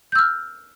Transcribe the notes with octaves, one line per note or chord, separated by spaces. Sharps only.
E6 F6 G6